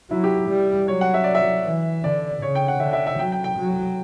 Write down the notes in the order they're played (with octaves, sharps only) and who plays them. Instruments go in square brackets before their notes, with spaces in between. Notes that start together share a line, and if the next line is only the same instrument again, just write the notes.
[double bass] F#3 [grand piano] E4
[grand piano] G4
[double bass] G3
[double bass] F#3 [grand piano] C#5
[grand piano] F#5
E5
D5
E5
[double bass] E3
[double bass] D3 [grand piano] D5
[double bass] C#3 [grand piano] C#5
[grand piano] G5
F#5
[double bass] D3 [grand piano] E5
[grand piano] E5
E5
[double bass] F#3 [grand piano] G5
[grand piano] G5
G5
[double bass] F#3